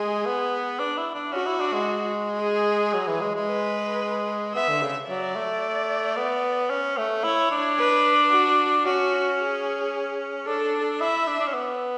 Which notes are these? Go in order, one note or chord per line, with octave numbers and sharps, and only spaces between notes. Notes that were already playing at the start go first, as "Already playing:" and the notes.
Already playing: G#3 G#4
B3
D4
E4
D4
C#4 F#4
E4
D4
G#3
G#4
F#3
E3
G#3
G#3
B4
B3 E5
D3
C#3
F#3 D5
A3
B3
C#4
A3
E4 C#5
D4
B4
F#4
C#4 F#4
G#4
D4 A4
E4 E5
D4
D4
C#4
B3